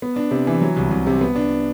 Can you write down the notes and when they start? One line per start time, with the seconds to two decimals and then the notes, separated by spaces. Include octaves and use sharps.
0.02 B3
0.16 D4
0.31 C3
0.47 E3
0.61 F#3
0.77 C2
0.91 C2
1.07 C3
1.21 B3
1.36 D4